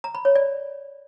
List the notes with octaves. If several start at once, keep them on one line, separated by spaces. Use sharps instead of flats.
A#5
B5
C#5
D5